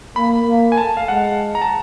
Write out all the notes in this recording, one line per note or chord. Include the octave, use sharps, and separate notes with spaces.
A#3 B5
A#3
G#5
A3 A5
F5
G#3 F#5
A#5
A5